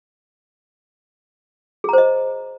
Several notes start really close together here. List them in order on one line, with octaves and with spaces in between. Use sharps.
G#4 A#5 C5 D#5